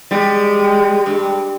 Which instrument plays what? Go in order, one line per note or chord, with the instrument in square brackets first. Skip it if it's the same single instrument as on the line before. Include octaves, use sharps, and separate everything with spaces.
[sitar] G3 [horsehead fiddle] G#3
[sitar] G2